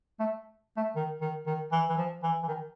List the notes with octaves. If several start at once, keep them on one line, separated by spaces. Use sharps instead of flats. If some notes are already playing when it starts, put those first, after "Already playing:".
A3
A3
D#3
D#3
D#3
E3
E3
F3
E3
E3
D#3